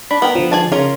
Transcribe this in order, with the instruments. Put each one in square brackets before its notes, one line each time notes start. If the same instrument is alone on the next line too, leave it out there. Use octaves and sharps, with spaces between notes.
[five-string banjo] D4 [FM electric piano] B5
[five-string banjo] B3 A#4 G5
[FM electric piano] D3 F3
[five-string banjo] G#4 G#5 A5
[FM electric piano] C#3 [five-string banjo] C#4 F4 A#4